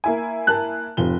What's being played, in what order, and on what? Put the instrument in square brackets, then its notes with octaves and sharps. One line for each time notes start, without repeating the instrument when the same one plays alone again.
[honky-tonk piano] A#3 E4 G#5
[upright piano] A#4 A5 F#6
F1 F3 G7